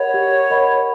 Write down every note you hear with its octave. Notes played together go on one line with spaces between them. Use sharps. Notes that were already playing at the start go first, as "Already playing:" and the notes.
Already playing: G4 A#4 C#5 D#5 F#5 B5
G4
A#4 D#5 F#5 B5